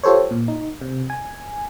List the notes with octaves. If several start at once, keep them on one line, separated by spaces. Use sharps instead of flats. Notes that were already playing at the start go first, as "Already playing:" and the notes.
F4 G4 A4 C5 C#5
A#2
D#4
C3
G#5